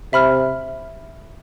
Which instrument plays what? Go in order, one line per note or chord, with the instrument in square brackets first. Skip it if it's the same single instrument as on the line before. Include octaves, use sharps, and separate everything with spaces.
[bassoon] C3 [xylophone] E5 B5 F6